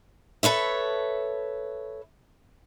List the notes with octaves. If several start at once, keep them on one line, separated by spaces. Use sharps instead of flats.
A4 B4 C#5 E5